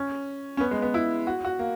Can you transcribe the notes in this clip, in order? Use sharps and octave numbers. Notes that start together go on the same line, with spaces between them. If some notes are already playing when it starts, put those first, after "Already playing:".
Already playing: C#4
C#4
B3
G#3
B3
E4
F#4
F#4
A#3